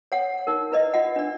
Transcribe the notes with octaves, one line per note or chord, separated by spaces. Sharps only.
C#5 F#5
D#4 A#4
E4 B4 D5 D#5
F4 D#5 F#5
D4 D5